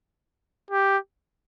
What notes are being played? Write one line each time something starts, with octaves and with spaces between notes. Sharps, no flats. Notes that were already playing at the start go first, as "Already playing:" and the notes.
G4